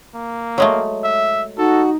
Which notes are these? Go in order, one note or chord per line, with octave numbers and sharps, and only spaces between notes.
A#3
F#3 G#3 A3
E5
D#4 F#4 A4